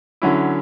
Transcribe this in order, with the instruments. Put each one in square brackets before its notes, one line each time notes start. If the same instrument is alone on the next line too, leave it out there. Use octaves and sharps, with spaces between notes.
[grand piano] D3 F#3 C#4 E4